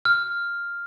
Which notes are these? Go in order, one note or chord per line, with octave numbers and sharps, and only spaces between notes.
F6